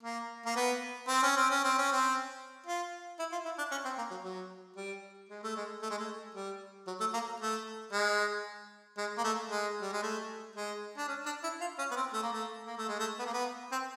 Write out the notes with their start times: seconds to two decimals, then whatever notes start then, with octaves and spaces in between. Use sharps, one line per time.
0.03 A#3
0.46 A#3
0.56 B3
1.08 C4
1.22 C#4
1.37 C4
1.50 C#4
1.64 C4
1.78 C#4
1.92 C4
2.66 F4
3.19 E4
3.32 F4
3.45 E4
3.58 D4
3.71 C#4
3.85 C4
3.98 A#3
4.11 F#3
4.24 F#3
4.76 G3
5.29 G#3
5.43 A3
5.56 G#3
5.82 A3
5.90 G#3
5.98 A3
6.35 G3
6.87 F#3
7.00 A3
7.14 A#3
7.40 A3
7.92 G#3
8.98 G#3
9.18 A#3
9.24 A3
9.50 G#3
9.81 G3
9.92 G#3
10.03 A3
10.56 G#3
10.97 D4
11.08 C#4
11.26 D4
11.43 E4
11.61 F4
11.78 C#4
11.91 B3
11.96 C4
12.13 A3
12.22 A#3
12.32 A3
12.66 A#3
12.77 A3
12.88 G#3
12.99 A3
13.19 B3
13.26 A#3
13.33 B3
13.72 C4